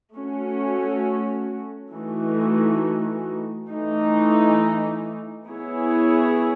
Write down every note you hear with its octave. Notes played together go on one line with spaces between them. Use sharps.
A3 C#4 F#4
E3 A3 D#4 F#4
E3 A3 D#4
B3 E4 G#4 C#5